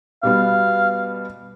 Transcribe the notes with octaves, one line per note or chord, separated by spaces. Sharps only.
B2 G3 B3 F5